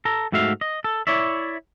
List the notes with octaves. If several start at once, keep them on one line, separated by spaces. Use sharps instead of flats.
A4 A#5
G#2 A3 F#4 E5 F5
D#5
A4
E4 C#5 D5 E5